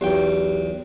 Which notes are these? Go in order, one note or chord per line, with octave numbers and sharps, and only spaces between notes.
B1 E2 G4 G5